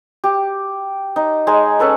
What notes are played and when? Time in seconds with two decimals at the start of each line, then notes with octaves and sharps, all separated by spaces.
0.24 G4
1.16 D#4
1.47 G#3 D#4 G#5
1.79 C#4 A4 B4 F#5